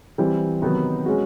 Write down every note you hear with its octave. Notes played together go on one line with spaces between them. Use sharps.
E3 G3 C4
C3 D#3 F#3 B3 D#4
G#3 C#4 F#4